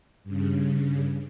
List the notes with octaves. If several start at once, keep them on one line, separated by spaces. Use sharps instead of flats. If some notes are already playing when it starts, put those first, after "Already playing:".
G2 C#3